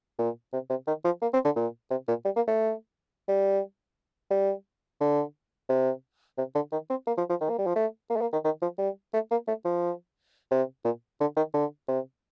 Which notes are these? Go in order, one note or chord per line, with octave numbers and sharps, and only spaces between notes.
A#2
C3
C3
D#3
F3
A#3
C4
D3
A#2
C3
A#2
G3
A#3
A3
G3
G3
D3
C3
C3
D3
D#3
C4
A#3
F3
F3
D#3
A#3
G3
F3
A3
A#3
A3
A#3
D#3
D#3
F3
G3
A3
A#3
A3
F3
C3
A#2
D3
D#3
D3
C3